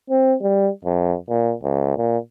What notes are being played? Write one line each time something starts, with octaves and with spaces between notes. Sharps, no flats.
C4
G3
F2
A#2
C#2
A#2